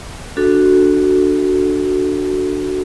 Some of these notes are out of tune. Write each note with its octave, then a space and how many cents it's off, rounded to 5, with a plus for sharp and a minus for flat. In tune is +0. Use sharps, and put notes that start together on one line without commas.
D4 +5 F#4 +0 A4 +0